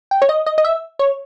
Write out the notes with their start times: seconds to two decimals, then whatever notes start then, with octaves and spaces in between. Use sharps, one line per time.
0.11 G5
0.22 C#5
0.29 D#5
0.46 D#5
0.58 D#5
0.65 E5
0.99 C#5